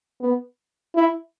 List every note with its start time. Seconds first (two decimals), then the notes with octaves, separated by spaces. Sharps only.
0.20 B3
0.95 E4